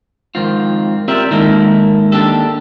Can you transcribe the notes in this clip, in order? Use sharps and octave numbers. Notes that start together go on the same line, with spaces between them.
F2 G#2 D#3 C4 F4
C4 F4 G4 A#4 D5 E5
G#2 D#3 A#3 D#4 E4 A4
D#2 D4 G4 A4